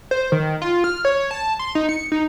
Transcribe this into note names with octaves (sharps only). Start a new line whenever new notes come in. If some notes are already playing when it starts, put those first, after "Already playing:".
C5
D#3
F4
F6
C#5
A5
C6
D#4
C#7
D#4